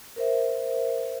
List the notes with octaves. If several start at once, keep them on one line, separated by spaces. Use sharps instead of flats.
A#4 C5 E5